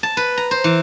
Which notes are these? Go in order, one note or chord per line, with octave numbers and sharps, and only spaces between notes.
A5
B4
A#5
C5
E3